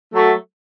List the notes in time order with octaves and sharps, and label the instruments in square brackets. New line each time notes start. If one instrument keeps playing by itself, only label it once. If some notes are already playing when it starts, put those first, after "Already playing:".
[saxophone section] F#3 A3